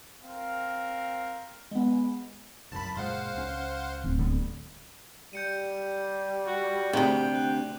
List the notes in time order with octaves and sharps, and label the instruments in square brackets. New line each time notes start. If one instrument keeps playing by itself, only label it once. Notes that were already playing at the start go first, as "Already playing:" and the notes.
[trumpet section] C4 A#4 F5
[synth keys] G#3 B3
[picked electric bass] C2 F#2 [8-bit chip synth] A5 B5
[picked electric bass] F#1 A#2 G#3 [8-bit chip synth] C5 F5 F#5
[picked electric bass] C#2 C#4
[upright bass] D1 C4
[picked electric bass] D3 G3 B3
[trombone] G3 [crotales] G6 C#7 D#7
[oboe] F#4
[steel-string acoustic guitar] D2 C3 [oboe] G5 [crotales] D6 F#7
[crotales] F#6